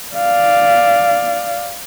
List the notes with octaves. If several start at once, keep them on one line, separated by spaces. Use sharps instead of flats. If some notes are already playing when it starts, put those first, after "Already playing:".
D5 F5